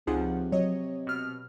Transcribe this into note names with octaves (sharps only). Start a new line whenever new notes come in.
C#2 C3 F3 D#4 F4 G#4 F#5
F#3 C#5 D#5
B2 F6